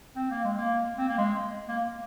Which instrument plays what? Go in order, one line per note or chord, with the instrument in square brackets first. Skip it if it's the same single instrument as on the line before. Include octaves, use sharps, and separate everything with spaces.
[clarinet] C4
A#3
G#3
A#3
C4
A#3
G#3
A#3